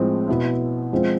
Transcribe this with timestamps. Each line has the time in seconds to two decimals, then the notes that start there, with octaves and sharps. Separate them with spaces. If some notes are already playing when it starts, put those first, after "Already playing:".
Already playing: A2 F3 G#3 C4
0.28 B2 B3 E4
0.92 F3 G#3 C4 F4